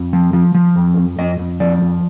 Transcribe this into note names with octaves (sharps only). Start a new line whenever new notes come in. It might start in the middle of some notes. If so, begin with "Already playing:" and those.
Already playing: F2
F3
F3
F3
F2
F2
F2 D#5
F2
F3 D5
F2